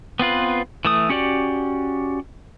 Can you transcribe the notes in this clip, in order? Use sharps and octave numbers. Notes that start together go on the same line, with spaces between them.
B3 C4 F4 B4
E3 A3 D#6
C#4 F#4 G4 D5